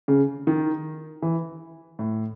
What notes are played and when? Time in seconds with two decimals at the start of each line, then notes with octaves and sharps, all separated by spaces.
0.08 C#3
0.47 D#3
1.22 E3
1.99 A2